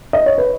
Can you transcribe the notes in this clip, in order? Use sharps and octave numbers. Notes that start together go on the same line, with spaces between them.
D#5
C#5
B4